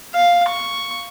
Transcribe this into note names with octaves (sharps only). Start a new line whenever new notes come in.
F5
C#6